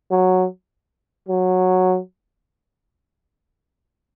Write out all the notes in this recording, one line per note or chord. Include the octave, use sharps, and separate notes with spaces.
F#3
F#3